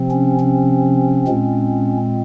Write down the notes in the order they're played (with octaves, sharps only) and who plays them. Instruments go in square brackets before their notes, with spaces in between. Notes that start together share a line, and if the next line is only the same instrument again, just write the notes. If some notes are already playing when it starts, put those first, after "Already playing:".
Already playing: [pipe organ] C3 F3 C4
C#4
C#4
A#2 G#3 C4